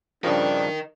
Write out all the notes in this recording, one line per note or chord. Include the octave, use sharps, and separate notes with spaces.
G2 C#3 F3 D4 A#4 D#5